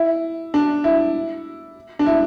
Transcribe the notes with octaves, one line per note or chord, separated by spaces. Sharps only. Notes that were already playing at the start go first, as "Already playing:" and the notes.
Already playing: E4
D4
E4
D4
E4